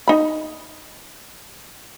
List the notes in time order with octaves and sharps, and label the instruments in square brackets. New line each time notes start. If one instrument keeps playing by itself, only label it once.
[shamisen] D#4 B5